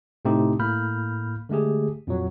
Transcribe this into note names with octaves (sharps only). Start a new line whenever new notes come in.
A2 C3 A3 C4 D#4 G4
A2 A#3 B5 F6 G6
D3 G#3 A3 G4 G#4
F2 A#2 F#3